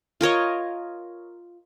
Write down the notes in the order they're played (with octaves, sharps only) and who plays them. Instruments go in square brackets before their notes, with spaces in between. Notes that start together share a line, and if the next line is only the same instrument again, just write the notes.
[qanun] F4 A#4 C#5 D#5